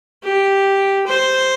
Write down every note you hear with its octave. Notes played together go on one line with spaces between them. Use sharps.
G4
C5